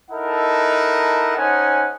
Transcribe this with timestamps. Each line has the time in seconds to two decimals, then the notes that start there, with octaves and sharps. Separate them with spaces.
0.11 D#4 E4 A4 A#4 F#5 A5
1.37 C#4 D#4 A4 C5 F#5 G#5